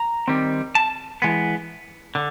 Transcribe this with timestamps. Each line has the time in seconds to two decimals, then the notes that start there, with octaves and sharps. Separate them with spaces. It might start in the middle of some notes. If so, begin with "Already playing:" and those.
Already playing: A#5
0.28 D#3 G3 C4
0.75 A5
1.22 E3 G#3 B3
2.15 D3